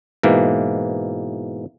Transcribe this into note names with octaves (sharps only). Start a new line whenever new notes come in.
G#2 B2 E3 A#3